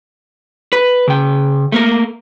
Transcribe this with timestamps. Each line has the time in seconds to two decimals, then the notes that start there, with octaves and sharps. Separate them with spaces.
0.73 B4
1.08 C#3 G5
1.72 A3 A#3 A#4